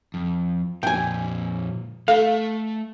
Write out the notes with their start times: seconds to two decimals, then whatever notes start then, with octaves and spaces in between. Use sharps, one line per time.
0.14 F2
0.83 F2 A#2 G5 G#5
2.08 A3 A4 F5